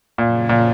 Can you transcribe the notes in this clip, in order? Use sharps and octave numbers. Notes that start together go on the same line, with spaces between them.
F#2 A#2 C#3 F3
A#2